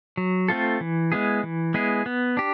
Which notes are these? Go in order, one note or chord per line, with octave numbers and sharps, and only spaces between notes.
F#3
A3 C4 F4 A4
E3
G#3 B3 E4 G#4
E3
G#3 B3 E4 G#4
B3
D4 G4